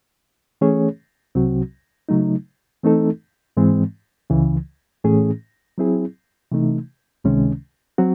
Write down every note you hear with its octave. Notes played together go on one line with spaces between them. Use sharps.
E3 A3 C#4 G#4 C#5
C2 C3 F#3 C4 F#4
C#3 F#3 A3 D#4
E3 A3 C4 D#4 A4
G#2 E3 G#3 C4
C#2 C#3 E3
A2 E3 A3 C#4 G#4
F#3 C4 E4 G#4
C3 E3 A3 D#4
C#2 C3 D#3 G#3 C#4
F#3 C4 F#4